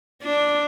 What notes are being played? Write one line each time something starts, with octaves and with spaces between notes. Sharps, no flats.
D4